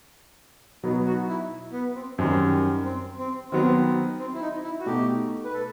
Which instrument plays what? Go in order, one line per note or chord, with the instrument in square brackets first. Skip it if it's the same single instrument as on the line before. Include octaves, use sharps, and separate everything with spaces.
[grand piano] B2 F#3 B3 D#4
[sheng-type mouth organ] F#4
E4
B3
C4
[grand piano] F#2 D#3 G3 [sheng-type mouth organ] C4
[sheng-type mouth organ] C4
C4
[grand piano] D#3 F#3 B3 [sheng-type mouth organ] C4
[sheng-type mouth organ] C4
E4
D#4
E4
F#4
[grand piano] B2 A3 D#4 [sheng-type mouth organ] G4
[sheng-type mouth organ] B4
A4